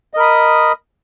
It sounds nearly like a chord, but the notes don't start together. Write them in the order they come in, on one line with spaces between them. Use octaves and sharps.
D#5 A#4 B5 D#6